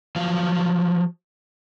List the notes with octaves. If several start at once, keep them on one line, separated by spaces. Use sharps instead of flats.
F3 F#3 F5